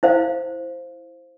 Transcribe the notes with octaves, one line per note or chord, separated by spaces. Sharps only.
E4 C5 F5